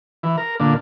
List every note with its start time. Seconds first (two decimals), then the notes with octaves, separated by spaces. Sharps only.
0.23 E3
0.37 A#4
0.60 A#2 D3